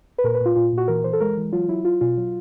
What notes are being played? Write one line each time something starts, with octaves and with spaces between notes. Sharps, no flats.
B4
A#2 A#4
B4
A#2 F4
A#2 F4
A#2 F#4
E3 A#4
E3 C5
A4
G#3 A#4
E3
F#3 F4
F#3 E4
F#3 F4
B2 F4
F#3